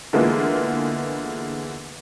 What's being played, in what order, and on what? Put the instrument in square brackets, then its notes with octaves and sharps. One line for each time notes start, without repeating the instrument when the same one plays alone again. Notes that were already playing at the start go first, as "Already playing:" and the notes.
[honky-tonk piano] D3 E3 G#3 A#3 B3 F4